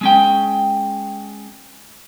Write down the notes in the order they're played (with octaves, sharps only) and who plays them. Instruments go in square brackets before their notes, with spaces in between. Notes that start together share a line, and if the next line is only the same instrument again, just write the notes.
[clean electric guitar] G#3 C#4 G5